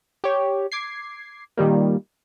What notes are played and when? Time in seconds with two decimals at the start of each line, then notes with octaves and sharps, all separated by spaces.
0.24 G4 C#5
0.72 D6 G#6 C7
1.57 A#2 D#3 G3 A#3